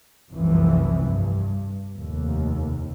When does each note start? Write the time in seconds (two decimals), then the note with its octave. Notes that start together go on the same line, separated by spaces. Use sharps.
0.31 F1 C2 F#2 C3 E3 F3
1.02 G2
1.95 F1 D#2